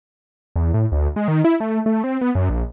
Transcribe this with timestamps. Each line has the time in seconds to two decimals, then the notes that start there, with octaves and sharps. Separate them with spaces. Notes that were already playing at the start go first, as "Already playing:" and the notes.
0.56 E2
0.74 A2
0.92 D2
1.16 G#3
1.28 D#3
1.45 E4
1.60 A3
1.86 A3
2.04 C4
2.21 B3
2.35 F#2
2.50 A#1